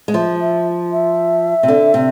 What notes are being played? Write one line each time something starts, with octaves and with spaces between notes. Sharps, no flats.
G#3
F3 E5
E5
E5
C3
D3
C3